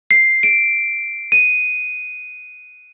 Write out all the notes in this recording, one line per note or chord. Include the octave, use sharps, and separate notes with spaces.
C7
D7
D#7